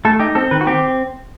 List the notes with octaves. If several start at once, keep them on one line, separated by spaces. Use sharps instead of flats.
A3 A4
D#4 G4
C4 A4
D#3 B4
F#4
C4 G4